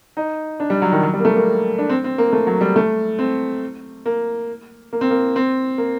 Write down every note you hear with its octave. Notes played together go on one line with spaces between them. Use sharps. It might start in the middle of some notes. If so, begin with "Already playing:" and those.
D#4
D4
G3
F#3
D#3
F#3
G3
A#3
A3
A#3
D4
C4
C4
A#3
A3
F#3
G3
A3
C4
A#3
A#3
C4
A#3
C4
A#3